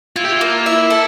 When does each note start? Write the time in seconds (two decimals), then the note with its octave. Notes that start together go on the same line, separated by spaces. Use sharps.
0.16 E4 F4
0.24 G4
0.32 F4
0.41 A#3
0.66 E4 E5
0.90 A4